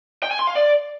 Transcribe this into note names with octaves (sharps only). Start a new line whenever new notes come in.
G5
G#5
C6
F5
D5